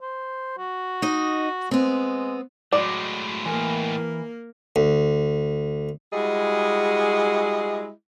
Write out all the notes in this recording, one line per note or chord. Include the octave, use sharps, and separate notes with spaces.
C5
F#4
D#4 D#5
G#3 B3 C4
A2 F#3 G#3 D5
E3 A#3 A#4
D2
G3 G#3 E4 F#4 G#4 D#5